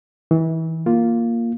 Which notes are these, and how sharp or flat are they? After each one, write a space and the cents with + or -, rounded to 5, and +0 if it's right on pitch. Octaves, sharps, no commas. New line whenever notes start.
E3 -30 D#4 +0
A#3 +0 F4 +0